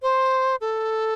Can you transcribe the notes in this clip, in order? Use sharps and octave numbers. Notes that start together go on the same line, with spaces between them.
C5
A4